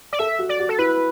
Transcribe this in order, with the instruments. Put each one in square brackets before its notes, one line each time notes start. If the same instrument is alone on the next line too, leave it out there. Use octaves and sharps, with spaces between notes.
[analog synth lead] D5
[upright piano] A4 [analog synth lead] E5
[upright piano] F#4
[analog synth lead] D5
[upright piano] F#4
[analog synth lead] A4
[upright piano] E4 [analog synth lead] B4